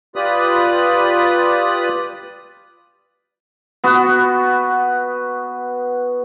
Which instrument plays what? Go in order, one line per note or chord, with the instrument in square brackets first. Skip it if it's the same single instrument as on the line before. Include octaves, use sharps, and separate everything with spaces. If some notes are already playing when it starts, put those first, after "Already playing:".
[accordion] F4 G4 B4 D5 B5 D#6
[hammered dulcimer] B3 F#4